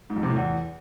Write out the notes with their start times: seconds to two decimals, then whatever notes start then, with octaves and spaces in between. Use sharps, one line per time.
0.10 G#2
0.16 F2
0.23 C3
0.30 A2
0.36 E2